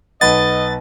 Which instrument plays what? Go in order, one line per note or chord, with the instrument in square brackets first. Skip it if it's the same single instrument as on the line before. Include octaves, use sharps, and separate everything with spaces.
[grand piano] B1 B4 F#5 [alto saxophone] D#5 [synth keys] A6